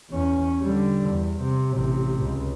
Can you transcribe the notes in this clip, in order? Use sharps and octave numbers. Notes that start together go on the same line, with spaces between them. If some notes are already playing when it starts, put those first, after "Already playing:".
E2 C#4
D3 G3
E2
C3
A1 C3
C#2